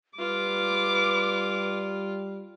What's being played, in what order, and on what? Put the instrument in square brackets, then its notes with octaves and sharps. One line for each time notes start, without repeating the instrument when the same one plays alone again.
[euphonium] G3 [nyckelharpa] F4 [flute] B4 [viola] D6